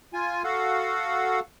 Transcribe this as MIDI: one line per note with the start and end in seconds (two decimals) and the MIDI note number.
0.13 0.43 65
0.13 0.43 80
0.44 1.40 66
0.44 1.40 69
0.44 1.40 77
0.44 1.40 78